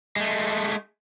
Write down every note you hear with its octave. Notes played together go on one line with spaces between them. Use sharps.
G#3 A3